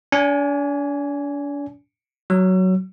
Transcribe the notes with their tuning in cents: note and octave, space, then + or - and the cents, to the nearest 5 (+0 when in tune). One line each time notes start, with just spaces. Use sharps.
D4 -40 G#5 +0
F#3 +10 E6 +40